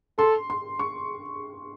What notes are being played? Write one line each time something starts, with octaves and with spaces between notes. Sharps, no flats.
A4 C6
C6
C#6